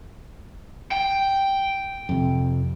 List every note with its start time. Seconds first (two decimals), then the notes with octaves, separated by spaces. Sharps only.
0.92 G5
2.09 F2 C3